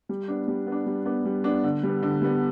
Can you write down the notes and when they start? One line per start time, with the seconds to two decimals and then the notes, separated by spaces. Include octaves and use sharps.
0.09 G3
0.28 B3 D4
0.48 G3
0.67 B3
0.72 D4
0.86 G3
1.05 B3 D4
1.25 G3
1.44 B3 D4
1.64 D3
1.83 G3 B3
2.03 D3
2.22 G3 B3